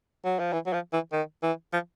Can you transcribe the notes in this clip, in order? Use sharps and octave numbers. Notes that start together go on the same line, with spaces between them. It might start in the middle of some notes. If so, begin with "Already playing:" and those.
F#3
F3
E3
F#3
F3
E3
D#3
E3
F3